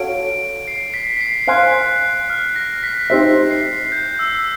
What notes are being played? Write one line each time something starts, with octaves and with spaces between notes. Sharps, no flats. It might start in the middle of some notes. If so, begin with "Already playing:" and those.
Already playing: F#4 A4 C#5 F5 D7
C7
B6
B6
C7
C5 F5 G#5 C6 F#6
F6
A#6
B6
D#4 G4 C5 E5 B6
C7
G6
E6